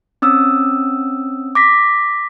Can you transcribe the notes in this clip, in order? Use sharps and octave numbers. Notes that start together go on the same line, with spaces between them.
C4 C#4 D#6 E6
D6 A#6 B6